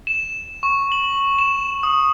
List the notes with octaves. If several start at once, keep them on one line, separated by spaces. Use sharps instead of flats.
E7
C#6
F#7
E7
D#6